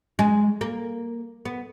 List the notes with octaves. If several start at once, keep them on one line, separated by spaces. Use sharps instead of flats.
G#3
A#3
B3